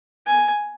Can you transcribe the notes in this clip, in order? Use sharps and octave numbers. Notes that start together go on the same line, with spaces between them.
G#5